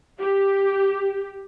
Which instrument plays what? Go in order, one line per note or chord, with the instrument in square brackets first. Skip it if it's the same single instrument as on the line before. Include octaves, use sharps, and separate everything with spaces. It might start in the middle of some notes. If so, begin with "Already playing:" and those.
[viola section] G4